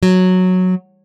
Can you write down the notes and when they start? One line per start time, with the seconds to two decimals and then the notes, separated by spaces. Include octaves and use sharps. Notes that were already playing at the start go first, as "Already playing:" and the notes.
0.03 F#3